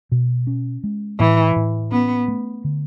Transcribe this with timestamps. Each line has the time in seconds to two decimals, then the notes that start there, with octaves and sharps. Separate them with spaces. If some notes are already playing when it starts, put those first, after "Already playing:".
0.12 B2
0.47 C#4
0.84 G#3
1.19 A2 E3
1.56 A2
1.92 B3 C#4
2.28 A3
2.64 D3